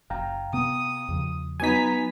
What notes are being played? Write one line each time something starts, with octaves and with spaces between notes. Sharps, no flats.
F#1 F5 G5 A#5
C3 B3 D#6
E2 C#3 F3
F#3 B3 D#4 G#5 A#5 B6